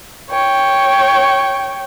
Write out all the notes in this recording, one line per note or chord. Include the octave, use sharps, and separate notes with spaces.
C#5 G5